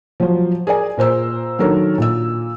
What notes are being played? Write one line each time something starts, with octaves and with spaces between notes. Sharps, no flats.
F3 F#3 C5
G#4 A#4 D5 G#5
A#2 A#4 C5 E6
D#3 F#3 D4 A4 A#4 C#5
A#2 E6